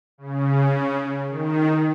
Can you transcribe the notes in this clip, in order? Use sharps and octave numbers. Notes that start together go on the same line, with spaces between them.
C#3
D#3